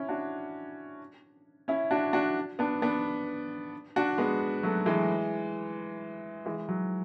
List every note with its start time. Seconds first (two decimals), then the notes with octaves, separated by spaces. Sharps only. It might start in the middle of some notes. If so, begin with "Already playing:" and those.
Already playing: C#4 E4
0.09 D4 F#4
1.68 C#4 E4
1.91 D4 F#4
2.13 D4 F#4
2.59 B3 D4
2.82 B3 D4
3.96 D4 F#4
4.18 G#3 B3
4.63 F#3 A3
4.86 E3 G#3
6.46 E3 G#3
6.69 F#3